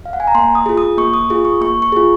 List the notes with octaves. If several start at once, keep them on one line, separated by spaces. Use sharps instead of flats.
F5
F#5
G#5
A#5
A#3 C6
D#6
F4 G#4
D#6
A#3 C#6
D#6
F4 G#4
C#6
A#3 C#6
C#6
F4 G#4